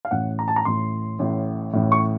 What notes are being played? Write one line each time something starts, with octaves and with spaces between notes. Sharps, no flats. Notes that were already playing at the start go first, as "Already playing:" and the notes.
F5
A1 A2 F#5
A#5
A5
A#5
A1 A2 C6
A1 A2
A1 A2
C#6